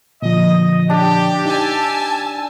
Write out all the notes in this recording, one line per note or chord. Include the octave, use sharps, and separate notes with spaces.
A#2 D3 F3 D#5
D4 G4
D#4 G#5 A5 E6